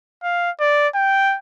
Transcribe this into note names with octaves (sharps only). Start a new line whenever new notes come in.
F5
D5
G5